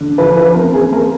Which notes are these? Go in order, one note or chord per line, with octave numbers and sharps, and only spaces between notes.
D3
F3 B4
F3 B4
C4 A#4
C4 G#4
A3 A#4